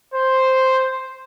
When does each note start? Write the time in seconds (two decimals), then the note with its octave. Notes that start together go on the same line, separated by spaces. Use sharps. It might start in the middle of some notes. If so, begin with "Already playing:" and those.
0.14 C5